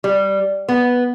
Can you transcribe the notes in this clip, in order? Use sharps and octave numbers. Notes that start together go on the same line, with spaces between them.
G3
B3